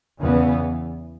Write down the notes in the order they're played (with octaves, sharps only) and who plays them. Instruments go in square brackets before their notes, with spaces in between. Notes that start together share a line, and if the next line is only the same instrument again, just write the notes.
[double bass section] E2 C#3 E3 B3